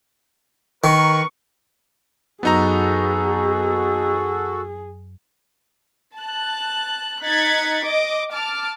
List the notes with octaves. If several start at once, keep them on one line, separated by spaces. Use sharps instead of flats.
D#3 A#4 B4 C#6
F#2 F#3 B3 D#4 F#4 G#4 A4 A#5
A5 F#6
D#4 F#6 G#6 A6 B6 C#7
D#5 D6
A5 D6 F6